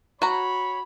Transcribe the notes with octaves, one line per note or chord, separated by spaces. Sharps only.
F#4 C#5 A#5 B5